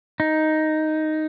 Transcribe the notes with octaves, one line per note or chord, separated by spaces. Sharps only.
D#4